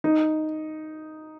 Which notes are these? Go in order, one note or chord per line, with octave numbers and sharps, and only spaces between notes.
D#4